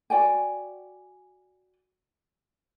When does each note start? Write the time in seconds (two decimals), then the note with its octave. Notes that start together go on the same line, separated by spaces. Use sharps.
0.10 F#4 D5 G5 G#5